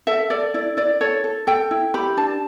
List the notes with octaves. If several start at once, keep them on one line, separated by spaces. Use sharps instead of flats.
A4 E5
A4 D5
E4 D5
E4 D5
A4 C#5
A4
A4 G5
E4
G4 B5
D4 A5